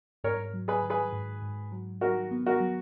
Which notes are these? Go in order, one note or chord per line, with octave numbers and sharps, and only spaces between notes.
G#2 A#4 C#5
F#3
G#4 B4
D#3
G#4 B4
G#2
G#2
F#3
D#3 F#4 A#4
B3
F#4 A#4
F#3